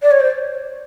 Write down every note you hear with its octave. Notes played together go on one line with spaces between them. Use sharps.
D5
C#5
C5